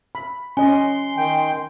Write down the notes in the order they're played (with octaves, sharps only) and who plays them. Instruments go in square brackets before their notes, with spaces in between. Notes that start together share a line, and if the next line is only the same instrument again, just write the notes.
[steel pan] B5
[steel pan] C#4 D#5 [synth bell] G#5 [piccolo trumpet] C6
[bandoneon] D#3 G5